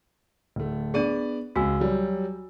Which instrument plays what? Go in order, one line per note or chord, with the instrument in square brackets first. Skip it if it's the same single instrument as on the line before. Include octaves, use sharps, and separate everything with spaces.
[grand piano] D1 A3
[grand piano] B3 D5 D#7 [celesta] D4 G#4
[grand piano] C#2 [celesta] F#4 G#5 E6
[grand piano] F#3 G3